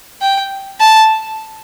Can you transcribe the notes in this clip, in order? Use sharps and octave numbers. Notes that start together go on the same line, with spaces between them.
G5
A5